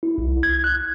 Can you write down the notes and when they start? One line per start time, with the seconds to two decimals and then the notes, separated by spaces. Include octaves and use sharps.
0.03 E4
0.18 C2
0.43 G#6
0.64 F#6